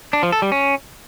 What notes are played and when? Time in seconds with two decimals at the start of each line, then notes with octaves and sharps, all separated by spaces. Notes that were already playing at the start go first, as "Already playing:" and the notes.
0.13 D4
0.23 F3
0.32 A4
0.42 G3
0.52 C#4